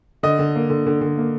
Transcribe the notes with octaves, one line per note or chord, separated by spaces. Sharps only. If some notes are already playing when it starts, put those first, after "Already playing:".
D3 D#5
D3
A#3
D3
D3
D3
A#3